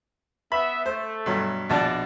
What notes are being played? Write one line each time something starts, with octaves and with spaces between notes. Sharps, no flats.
B3 E5 B5
A3 C5
G2 B2 F#3
A#1 B2 D4 D5 A5